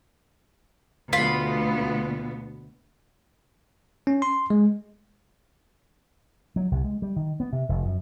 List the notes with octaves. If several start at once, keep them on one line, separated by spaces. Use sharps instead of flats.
D2 B2 B3 F4 B5
C#4
C6
G#3
F#3
C2
G#3
G3
D#3
B3
C3
F1
F#2